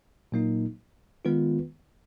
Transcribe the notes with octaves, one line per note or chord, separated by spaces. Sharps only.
A#2 F#3 A#3 D#4
D#3 G#3 B3 F4 B4